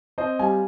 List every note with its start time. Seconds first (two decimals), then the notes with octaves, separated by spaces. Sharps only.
0.18 C4 C5 D#5
0.39 G3 F5 G#5